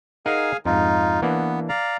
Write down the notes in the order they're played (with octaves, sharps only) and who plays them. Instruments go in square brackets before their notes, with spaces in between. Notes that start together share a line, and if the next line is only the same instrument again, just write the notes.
[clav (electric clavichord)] D#4 A#4 F#5 [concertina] G#4 F5 G#5
[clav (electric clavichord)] F2 G#2 [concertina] D#4 F4
[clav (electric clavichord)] E3 A#3 D4 [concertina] B3
[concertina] D5 F5 A#5